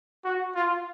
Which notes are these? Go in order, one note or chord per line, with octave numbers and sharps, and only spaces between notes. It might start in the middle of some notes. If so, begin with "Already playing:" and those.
F#4
F4